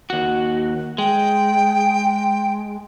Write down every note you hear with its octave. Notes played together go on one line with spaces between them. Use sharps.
D#2 F#4
G#3 G5